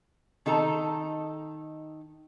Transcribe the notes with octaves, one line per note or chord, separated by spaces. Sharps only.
D#3 D#4 A4 A5 A#5